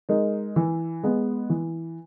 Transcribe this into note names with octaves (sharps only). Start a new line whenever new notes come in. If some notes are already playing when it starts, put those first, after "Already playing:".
G#3 D#4 A#4
E3
G#3 B3
E3